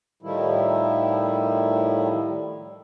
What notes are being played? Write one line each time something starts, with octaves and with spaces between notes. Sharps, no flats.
A2 D#3 F3 G3 E4